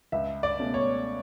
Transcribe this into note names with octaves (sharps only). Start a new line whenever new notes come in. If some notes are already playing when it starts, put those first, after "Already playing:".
C#2 E5
D5
B2 A3 C#4
C#5